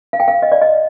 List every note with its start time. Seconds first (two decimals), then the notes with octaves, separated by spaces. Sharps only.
0.13 F5
0.20 G5
0.28 F5
0.42 D#5
0.52 D5
0.61 D#5